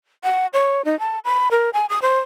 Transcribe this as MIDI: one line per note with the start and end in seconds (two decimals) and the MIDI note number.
0.24 0.46 78
0.53 0.82 73
0.85 0.98 63
0.99 1.19 81
1.25 1.48 83
1.51 1.70 70
1.73 1.86 80
1.89 1.99 87
2.02 2.19 72